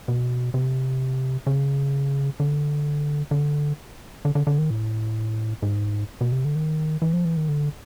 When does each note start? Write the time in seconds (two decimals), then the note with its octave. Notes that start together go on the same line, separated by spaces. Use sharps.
0.08 B2
0.54 C3
1.47 C#3
2.40 D3
3.31 D3
4.25 D3
4.35 D3
4.47 D3
4.58 D#3
4.70 A2
5.62 G#2
6.21 B2
6.32 C3
6.45 D3
6.55 D#3
7.02 E3
7.13 F3
7.25 E3
7.37 D#3
7.48 D3